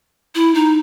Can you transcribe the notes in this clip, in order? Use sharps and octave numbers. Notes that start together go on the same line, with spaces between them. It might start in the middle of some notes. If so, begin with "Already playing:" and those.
E4
D#4